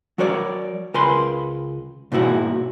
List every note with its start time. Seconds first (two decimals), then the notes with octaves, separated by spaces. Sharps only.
0.18 F#3 F#4 A#4 C#5 D5
0.94 C#2 A#4 B4 G#5 B5 C6
2.12 G#2 B2 A#3 E4 F#4